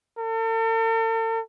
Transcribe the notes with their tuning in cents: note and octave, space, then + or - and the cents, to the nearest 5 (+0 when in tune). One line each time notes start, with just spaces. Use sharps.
A4 +45